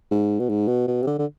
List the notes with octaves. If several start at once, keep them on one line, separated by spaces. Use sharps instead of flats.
G#2
B2
G#2
B2
B2
C3
D3
D3